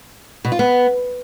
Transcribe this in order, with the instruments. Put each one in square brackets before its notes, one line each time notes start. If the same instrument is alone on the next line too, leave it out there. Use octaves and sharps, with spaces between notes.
[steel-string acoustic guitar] B2
F4
B3